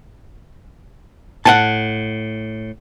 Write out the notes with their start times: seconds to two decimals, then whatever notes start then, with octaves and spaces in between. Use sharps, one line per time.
1.45 A2 F#5 G#5 A5